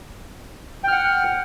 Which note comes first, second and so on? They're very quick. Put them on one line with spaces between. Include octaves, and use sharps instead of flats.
G5 F6 F#5